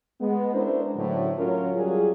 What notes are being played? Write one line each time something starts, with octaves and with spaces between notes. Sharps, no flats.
G#3 B3
C#4 D4 E4 A#4 C5
A2 D3 F#3
F#3 C#4 F4 A#4
F#3 G3 F4 G#4